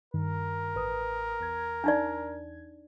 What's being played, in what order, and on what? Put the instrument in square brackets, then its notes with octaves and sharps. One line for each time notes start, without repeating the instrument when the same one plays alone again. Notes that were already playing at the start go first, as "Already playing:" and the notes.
[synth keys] G2 D#3 [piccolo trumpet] A#4
[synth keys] A1 B4 D#6
E2 G#6
[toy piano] D4 D#4 D5